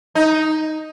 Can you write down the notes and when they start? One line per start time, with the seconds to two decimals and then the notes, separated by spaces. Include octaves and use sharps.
0.15 D#4